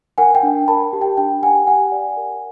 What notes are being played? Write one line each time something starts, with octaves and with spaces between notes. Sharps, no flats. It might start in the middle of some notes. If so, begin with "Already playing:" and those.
A#4 F#5 G#5
G5
D4
A#4 A5 B5
G4
G5
D4 G5
G4 F#5 G#5
G4 F#5 G#5
D5
A#4